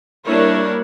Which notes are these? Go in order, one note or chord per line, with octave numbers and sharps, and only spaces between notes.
G3 A#3 D4 E4 A#4 C#5